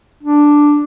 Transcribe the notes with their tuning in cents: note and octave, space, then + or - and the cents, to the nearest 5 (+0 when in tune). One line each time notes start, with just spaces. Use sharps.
D4 +0